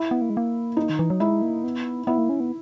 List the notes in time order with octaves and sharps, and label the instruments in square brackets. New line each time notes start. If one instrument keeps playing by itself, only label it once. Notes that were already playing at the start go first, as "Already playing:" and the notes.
Already playing: [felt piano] E4
[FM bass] B3
A#3
G#3
A#3
[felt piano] D#4
[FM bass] D#3
E3
F#3
[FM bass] G#3 [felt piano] E4
[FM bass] A#3
B3
[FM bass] B3 [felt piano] E4
[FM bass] A#3
C#4
B3